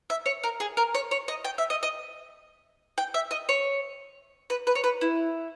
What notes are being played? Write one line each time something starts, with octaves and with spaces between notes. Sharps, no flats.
E5
C#5
A#4
G#4
A#4
C#5
C#5
D#5
G5
E5
D#5
D#5
G5
E5
D#5
C#5
B4
B4
C#5
B4
E4